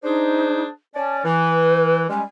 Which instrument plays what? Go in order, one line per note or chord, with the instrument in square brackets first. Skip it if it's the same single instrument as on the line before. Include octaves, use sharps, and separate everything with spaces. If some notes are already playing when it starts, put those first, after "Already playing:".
[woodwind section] D4 G#4 C5 [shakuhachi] D#4
[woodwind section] C#4 D5 [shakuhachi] A5
[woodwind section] E3 [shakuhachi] B4
[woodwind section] G3 G#3 C#4 [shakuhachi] G#5